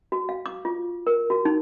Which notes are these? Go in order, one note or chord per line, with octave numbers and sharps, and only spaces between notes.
F#4
F5
D6
F4
A#4
F#4
D#4